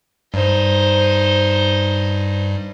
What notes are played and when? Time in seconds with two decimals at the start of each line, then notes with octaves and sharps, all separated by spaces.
0.34 G2 D#4 C5